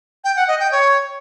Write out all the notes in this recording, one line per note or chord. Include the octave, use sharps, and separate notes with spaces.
G5
F#5
D#5
G5
C#5